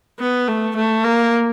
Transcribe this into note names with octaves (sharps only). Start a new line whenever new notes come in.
B3
A3
A3
A#3